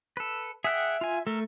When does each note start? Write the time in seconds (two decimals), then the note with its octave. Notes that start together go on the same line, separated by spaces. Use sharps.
0.17 A4 B4
0.64 G#4 E5 F#5 G5
1.01 F4 G#5
1.27 A3 A4 A#4